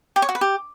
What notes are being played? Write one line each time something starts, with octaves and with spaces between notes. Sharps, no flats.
G4
C#5
F#4
B4
G4